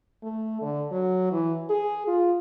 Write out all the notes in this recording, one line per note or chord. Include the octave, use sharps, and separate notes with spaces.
A3
D3
F#3
E3
G#4
F4